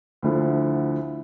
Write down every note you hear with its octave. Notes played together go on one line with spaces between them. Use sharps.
D2 D3 F3 E4